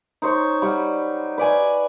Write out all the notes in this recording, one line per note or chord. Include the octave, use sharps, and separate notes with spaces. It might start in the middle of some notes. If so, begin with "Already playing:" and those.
D#4 C5 C#5
G3 F#5
B4 D5 G#5